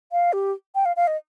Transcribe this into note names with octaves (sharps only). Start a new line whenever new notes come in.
F5
G4
G5
F5
F5
D#5